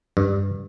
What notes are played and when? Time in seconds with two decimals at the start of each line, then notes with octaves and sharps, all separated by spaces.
0.17 G2